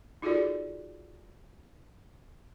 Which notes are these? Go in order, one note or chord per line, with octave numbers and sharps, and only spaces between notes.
D#4 F4 F#4 G#4 A4 D5